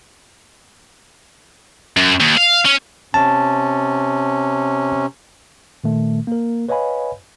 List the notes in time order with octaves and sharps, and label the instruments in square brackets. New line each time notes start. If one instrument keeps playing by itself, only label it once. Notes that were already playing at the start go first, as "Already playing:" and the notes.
[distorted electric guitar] F#2
D#2
F5
C#4
[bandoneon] C3 C#4 [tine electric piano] A5
[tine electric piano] A#2 D#3 A3
A#3 A#4
B4 C#5 D#5 F5 G#5 B5